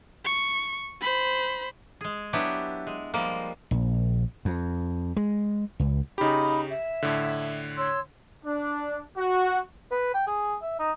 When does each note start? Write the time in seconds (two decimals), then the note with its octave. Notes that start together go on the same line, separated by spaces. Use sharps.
0.25 C#6
1.02 C5 B5
2.01 G#3 G#4
2.33 F#3 B3 D4 E4 G4
2.87 G#3
3.14 F3 G3 G#3 A#3
3.71 A#1
4.45 F2
5.17 G#3
5.80 C#2
6.18 C#3 D#4 G4 B5
6.70 E5
7.02 A2 D3
7.76 C#5 C6 E6
8.45 D4
9.17 F#4
9.91 B4
10.14 G5
10.27 G#4
10.62 E5
10.79 D#4